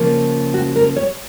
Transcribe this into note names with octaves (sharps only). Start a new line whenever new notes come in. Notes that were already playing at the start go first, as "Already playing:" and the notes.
Already playing: C#3 F3 A#3
F#4
A#4
C#5